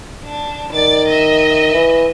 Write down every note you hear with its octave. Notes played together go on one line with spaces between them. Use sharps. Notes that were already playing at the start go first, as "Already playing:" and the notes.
D4
D#3 D5 A6
D#5 E5
E3